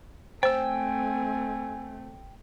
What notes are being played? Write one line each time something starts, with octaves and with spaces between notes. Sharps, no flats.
A3 C4 C5 G5 G#5 E6